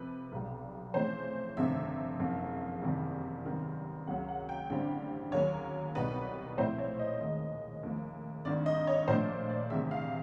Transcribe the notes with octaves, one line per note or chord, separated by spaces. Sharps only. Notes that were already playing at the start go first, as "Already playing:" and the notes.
Already playing: F2 C3 F3 B4
B1 B2 G3
F2 C#3 E3 A3 C#4 C5
G1 F2 C3 D#3 E5
F#1 F2 C#3
F#1 E2 C3 D#3 G3
G#1 F#2 D#3 G3 B3
C#2 C#3 F#3 A#3 F#5
F#5
G5
A1 G2 D3 G3 C4 G5
D#2 C#3 F#3 A#3 C#4 C#5
C2 B2 G3 B3 D#4 B4
A#2 F3 A3 C4 E4 C5
C#5
D#5
D#2 D#3 G#3
D#2 C#3 F3 A3
G#1 G2 D#3 D5
D#5
C#5
A#2 F3 A3 D4 C5
D5
E2 C3 D#3 G3 E5
F5